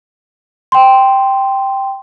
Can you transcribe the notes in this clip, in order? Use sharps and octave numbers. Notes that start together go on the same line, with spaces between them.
G5 C6